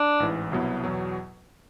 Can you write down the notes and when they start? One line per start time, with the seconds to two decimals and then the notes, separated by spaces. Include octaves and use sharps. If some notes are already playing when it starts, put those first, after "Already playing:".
Already playing: D4
0.20 A1 G#2 E3
0.52 C2 B2 F#3 B3 E4
0.84 E2 B2 F#3